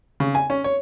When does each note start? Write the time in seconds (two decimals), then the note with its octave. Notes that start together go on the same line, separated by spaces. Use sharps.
0.20 C#3
0.35 G#5
0.50 C#4
0.64 C#5